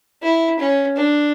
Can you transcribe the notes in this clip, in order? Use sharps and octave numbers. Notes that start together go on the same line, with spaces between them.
E4
C#4
D4